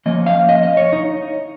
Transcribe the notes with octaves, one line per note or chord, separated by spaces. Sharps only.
F3 A#3 C#4 D#5
F5
D#5
D#5
C#5
D#4